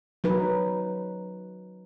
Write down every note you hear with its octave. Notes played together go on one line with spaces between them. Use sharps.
F#3 D#4 B4